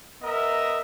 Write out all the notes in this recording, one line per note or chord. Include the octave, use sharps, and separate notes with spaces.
B3 A#4 D#5 E5 A#5